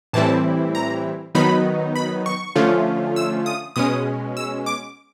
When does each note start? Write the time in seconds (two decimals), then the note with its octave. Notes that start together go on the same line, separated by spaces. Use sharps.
0.13 A2 E3 G3 C4 E4 A5
0.75 A#5
1.35 D#3 F#3 B3 D#4 B5
1.95 B5
2.26 C#6
2.56 D3 F3 A3 C#4 F4
3.16 E6
3.46 D#6
3.76 B2 G#3 C#4 D#6
4.37 E6
4.66 D6